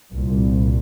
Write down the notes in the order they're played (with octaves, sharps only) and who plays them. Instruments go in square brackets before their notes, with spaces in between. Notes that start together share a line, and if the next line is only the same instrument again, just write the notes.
[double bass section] C2 A#2